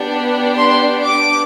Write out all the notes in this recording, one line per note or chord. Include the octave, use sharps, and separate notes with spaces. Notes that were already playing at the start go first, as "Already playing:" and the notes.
Already playing: B3 D4 G4
C6
D6